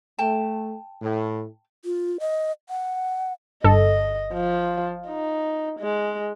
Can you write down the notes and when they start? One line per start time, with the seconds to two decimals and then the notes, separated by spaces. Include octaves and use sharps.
0.19 A3 G5 A5
1.02 A2
1.85 F4
2.20 D#5
2.69 F#5
3.64 G1 A4 D#5
4.34 F3
5.08 D#4
5.80 G#3